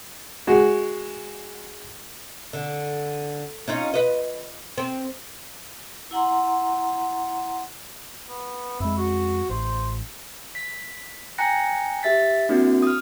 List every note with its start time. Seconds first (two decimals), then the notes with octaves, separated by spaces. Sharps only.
0.47 G#3 F#4
2.53 D3
3.68 C#4 D#4 F4
3.94 B4 D#5
4.78 C4
6.11 E4 F#5 A#5 C6
8.29 B3
8.80 F2 G#3 E4
8.97 F#4
9.49 A1 C5
10.55 B6
11.38 G5 G#5 A#5 F#6 A#6 C#7
12.03 G4 E5 A6 B6
12.49 A#3 C4 D4 E4 F#4
12.82 D#6 F6